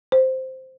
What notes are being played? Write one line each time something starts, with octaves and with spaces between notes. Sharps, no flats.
C5